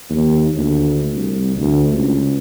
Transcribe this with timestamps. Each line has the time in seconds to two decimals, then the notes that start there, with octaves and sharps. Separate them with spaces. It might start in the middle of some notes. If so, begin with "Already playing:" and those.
0.10 D#2
0.54 D2
1.15 C2
1.57 D2
1.93 C#2